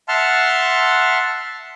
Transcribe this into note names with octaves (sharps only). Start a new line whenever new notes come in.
E5 F#5 A5 C6 F6